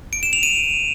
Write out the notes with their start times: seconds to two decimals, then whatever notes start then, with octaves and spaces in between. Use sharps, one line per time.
0.13 D7
0.23 E7
0.33 F7
0.43 D#7